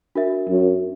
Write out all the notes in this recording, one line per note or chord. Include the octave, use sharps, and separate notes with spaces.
D4 F#4 A#4 E5
F#2